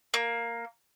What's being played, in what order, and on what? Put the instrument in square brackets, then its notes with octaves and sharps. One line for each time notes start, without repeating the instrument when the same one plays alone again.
[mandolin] A#3